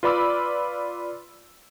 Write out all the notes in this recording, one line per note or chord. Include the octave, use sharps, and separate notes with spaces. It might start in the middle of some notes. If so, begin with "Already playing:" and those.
F4 B4 D5 B5 D6 E6